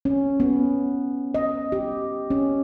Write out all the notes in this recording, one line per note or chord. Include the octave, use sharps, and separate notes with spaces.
C#4
B3
D#5
G4
C#4